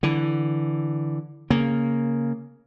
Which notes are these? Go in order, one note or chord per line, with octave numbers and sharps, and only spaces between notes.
D3 E3
C#3 A#3